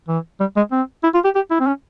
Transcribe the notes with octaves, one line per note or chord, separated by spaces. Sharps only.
E3
G3
G#3
C4
E4
F4
G4
G4
E4
C4
C#4